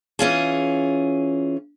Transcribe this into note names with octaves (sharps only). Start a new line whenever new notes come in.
E3 C#4 F4 G#4